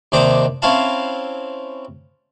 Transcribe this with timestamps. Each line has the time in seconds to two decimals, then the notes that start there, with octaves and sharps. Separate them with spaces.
0.12 D#2 C3 D4 D#4 C5 D6
0.62 C4 C#4 E4 F5 A5